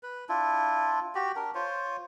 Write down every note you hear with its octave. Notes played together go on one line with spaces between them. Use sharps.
B4
D4 E4 F4
F#4 G4
D4 A#4
F4 C5 C#5